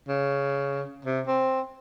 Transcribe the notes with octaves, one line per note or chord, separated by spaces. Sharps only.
C#3
C3
C4